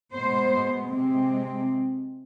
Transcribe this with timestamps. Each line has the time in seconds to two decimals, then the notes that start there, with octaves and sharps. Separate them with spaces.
0.14 B2 G#3 B3 C5
0.92 C3 G#3 C4